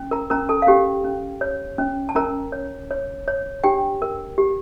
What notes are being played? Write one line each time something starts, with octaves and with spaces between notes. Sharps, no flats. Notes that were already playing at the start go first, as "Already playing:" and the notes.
Already playing: C#4
A#4 A#5
C#4 A#4 A#5
A4 A5
F5
C#4 G4 G5
C#4
C#5
C#4
A5
C#4 A#4 A#5
C#5
C#5
C#5
D4 G4 G5
A#4
G4